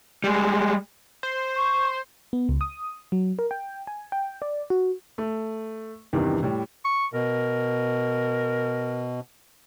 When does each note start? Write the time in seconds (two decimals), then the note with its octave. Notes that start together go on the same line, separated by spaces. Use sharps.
0.24 G3 G#3
1.23 C5
1.55 C#6
2.33 B3
2.49 C#2
2.61 D#6
3.12 F#3
3.39 A#4
3.51 G5
3.87 G#5
4.12 G5
4.42 D5
4.70 F#4
5.18 A3
6.13 E2 G2 C3 D#3 E3
6.43 A2 G3
6.85 C#6
7.13 B2 A#4